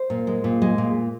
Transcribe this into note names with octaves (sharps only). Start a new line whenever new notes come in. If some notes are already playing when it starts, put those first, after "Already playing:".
Already playing: C5
A#2
G#3
A#2
G#3
A#2